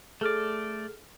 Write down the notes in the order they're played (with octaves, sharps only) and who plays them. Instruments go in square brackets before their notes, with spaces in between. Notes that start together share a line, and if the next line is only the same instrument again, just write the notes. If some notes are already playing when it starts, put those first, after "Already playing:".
[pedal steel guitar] A3 D5 [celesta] G#4 A4 F6